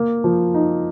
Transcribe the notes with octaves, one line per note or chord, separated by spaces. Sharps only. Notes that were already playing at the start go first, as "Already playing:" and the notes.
Already playing: A#3
F3
D#4